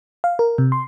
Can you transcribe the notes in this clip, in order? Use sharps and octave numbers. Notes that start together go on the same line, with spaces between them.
F5
A#4
C3
C6